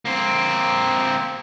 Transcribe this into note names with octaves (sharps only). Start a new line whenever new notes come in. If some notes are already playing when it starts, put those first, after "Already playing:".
A#3 C4